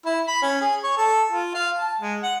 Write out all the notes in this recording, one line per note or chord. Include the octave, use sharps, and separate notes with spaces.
E4
B5
C#4
G#4
C#5
A4
F4
F5
A5
G#3
F#5